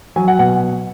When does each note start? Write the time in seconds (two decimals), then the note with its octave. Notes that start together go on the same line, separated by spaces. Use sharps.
0.16 F#3 G#5
0.28 F#5
0.39 B2 F#5